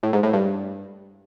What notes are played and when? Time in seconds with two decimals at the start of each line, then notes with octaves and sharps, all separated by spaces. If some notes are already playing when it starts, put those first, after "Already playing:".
0.03 A2
0.13 G#2
0.23 A2
0.33 G2